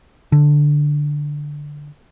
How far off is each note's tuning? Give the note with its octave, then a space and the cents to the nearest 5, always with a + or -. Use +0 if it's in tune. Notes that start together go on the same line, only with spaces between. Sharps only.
D3 +0